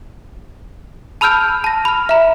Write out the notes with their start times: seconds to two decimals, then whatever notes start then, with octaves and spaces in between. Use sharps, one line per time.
1.21 A5 B5 E6 F6 G6 D7
1.64 A5 A#6
1.85 B5 F6
2.09 E5 A#5